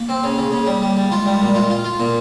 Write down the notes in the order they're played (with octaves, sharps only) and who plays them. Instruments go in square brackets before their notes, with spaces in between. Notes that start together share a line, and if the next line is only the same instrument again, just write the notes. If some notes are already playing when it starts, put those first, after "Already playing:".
Already playing: [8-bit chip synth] A#3
[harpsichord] C4
C#3
C#3
[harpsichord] C#3 [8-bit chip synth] A#3
[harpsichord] G3
G3
G3
[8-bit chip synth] G#3 [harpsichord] F4
[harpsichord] G3
A#2
F4
F4
F4
[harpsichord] A#2 [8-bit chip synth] A#3